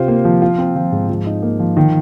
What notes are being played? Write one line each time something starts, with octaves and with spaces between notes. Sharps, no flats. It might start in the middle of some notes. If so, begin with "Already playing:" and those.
Already playing: C3 F4 C5
A#3
F3
F4
C4
F3
G#2
F3
D#4
A#3
F3
D#3